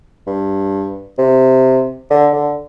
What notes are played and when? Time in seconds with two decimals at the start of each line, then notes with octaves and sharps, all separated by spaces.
0.27 G2
1.18 C3
2.10 D3
2.33 D3